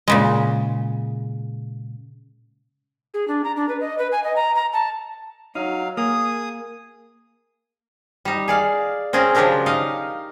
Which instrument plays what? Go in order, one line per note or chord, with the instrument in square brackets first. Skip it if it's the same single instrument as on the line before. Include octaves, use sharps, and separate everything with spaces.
[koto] A#2 C#3 G#3
[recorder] G#4
D4
A#5
D4
B4
D#5
B4
G#5
D#5
A#5
A#5
A5
[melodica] F#3 F5 [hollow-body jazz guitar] D#4
[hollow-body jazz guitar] A#3 [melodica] G#4 D#6
[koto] G3 D#4
G#4 D5 F5
C4 C#4 G#4 A#4
C#3 F3 F#3 D4 G4 A#4
D#4 D#5 F5